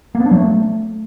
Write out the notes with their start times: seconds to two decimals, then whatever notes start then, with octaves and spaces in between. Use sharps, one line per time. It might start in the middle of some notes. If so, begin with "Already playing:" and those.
0.15 A#3
0.20 B3
0.26 D4
0.31 F#3
0.37 A3